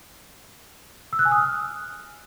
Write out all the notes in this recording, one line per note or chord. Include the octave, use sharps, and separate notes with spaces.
E6
F#6
G#5
D#6
F6